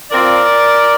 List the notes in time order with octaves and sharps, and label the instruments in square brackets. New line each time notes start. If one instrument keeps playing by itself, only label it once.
[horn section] F3 C4 F4 A#4 D5